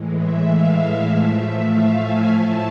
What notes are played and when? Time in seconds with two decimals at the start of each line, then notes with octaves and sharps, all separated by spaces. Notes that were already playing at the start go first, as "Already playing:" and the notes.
Already playing: A2 E3 G#3
0.19 E5
0.48 F5
1.08 A2 F3 A3 E5
1.69 F5
1.98 G#5
2.28 A2 F3 A3 A5